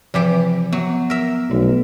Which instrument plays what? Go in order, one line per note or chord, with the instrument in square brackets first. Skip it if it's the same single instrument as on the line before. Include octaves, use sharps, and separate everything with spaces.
[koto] C3 E3 G4 [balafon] F3 D6
[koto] F#3 [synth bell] B3
[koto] A#4 E5
[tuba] B1 [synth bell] A3